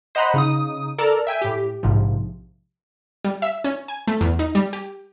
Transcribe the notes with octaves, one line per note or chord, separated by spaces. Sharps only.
C5 D#5 F#5 A#5 B5 F#6
C#3 D#4 D#6
A4 A#4 D5 A5 A#5
E5 G5 G#5
A2 G4
A#1 G#2 C3 F3
G3
E5
C#4
G#5
A3
E2
D#4
G3
G4